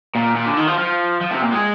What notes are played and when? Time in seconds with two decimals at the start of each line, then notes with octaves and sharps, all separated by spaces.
0.15 A#2
0.36 A#2
0.46 D3
0.57 D#3
0.68 F3
0.78 F3
1.21 F3
1.31 C3
1.42 A#2
1.52 G#3